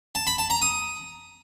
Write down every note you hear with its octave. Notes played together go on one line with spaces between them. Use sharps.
A5
B5
A5
A#5
D#6